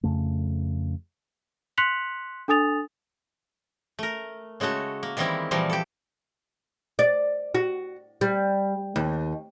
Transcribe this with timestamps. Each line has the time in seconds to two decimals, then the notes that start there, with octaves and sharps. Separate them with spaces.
0.03 F2 C#3 A3
1.78 C6 F#6 B6 C#7 F7 F#7
2.48 D4 A4 G#5 D#6 A6 F7
3.99 A3 A#4
4.60 C#3 G#3 A3 F#4 A4
5.03 A#3
5.17 D#3 E3 G3 G#3 C4 E4
5.51 A#2 E3 F3 G3 A#3
5.70 G4 A4
6.99 D5
7.55 F#4
8.21 G3
8.96 D#2